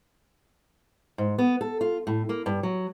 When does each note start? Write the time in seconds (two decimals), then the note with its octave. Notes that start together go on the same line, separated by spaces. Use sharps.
1.18 G#2
1.38 B3
1.61 A4
1.81 F4
2.07 A2
2.29 A#3
2.46 G2
2.63 F#3